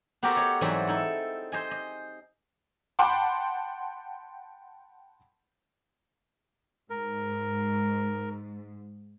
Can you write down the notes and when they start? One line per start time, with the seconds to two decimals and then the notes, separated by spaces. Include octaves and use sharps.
0.23 B3 F#4 G4 A4 A#4 C5
0.36 C#5 D#5
0.61 G#2 E3 F#3 G3 C4
0.87 D#4 E4 A4
1.52 C5 D#5 G#5
1.71 D#5
2.99 F#5 G5 A5 B5 C6 D6
6.90 G#2 A#4